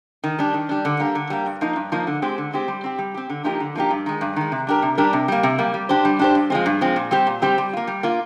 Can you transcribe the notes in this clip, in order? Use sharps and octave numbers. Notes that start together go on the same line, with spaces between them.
D#3
G3 D4
D#3
G3 D4
D3
G3 A#3
D3
G3 A#3
G2
F3 A#3 D#4
G2
F3 A#3 D#4
D3
G#3 C4 G4 C5
D3
G#3 C4 G4 C5
G3
C4 G4
G3
C4 G4
D3
F3 A#3 D#4 G4
D3
F3 A#3 D#4 G4
G2
D#3 G#3
G2
D#3 G#3
C3
G3 D4 G4 A#4
C3
G3 D4 G4 A#4
C3
G3 A#3
C3
G3 A#3
G3
D4 G4 C5
G3
D4 G4 C5
G2
F3 G#3 C4
G2
F3 G#3 C4
A#2
G3 C4 G4 C5
A#2
G3 C4 G4 C5
G3
A#3 F4
G3
A#3 F4